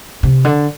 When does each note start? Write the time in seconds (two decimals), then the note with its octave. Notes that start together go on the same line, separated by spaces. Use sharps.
0.23 C3
0.45 D3